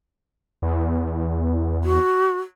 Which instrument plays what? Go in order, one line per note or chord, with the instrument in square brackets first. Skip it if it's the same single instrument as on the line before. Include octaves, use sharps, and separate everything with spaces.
[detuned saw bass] E2
[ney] F#4